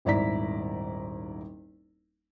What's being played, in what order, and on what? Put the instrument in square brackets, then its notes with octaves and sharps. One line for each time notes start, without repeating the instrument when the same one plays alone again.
[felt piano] D#1 G#1 E4 D5 A#5 B6